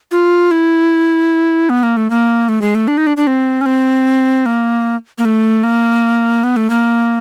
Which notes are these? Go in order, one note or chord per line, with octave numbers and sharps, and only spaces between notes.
F4
E4
B3
A#3
A3
A#3
A3
G#3
A3
D4
D#4
D4
D4
C4
C#4
C4
A#3
A#3
A3
A#3
B3
A3
A#3